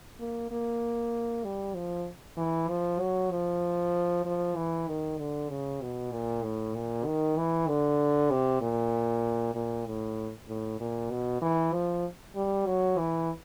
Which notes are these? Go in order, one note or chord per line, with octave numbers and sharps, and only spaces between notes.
A#3
A#3
G3
F3
E3
F3
F#3
F3
F3
E3
D#3
D3
C#3
B2
A#2
A2
A#2
D#3
E3
D3
C3
A#2
A#2
A2
A2
A#2
B2
E3
F3
G3
F#3
E3